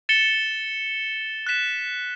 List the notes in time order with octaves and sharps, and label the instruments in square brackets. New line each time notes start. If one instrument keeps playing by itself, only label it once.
[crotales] A6 C#7 E7 G7
F#6 B6 E7